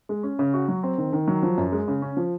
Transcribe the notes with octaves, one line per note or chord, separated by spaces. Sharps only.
G#3
C#4
C#3
F#4
F#3
C4
D#3
D#3
F#3
F3
F#2
G#3
C#3
C#4
F3